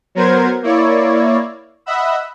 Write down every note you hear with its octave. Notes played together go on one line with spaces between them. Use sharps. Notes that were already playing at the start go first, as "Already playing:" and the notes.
F#3 B3 A#4 C5 G#6
A#3 E4 C#5 D5
D#5 E5 F#5 B5 E6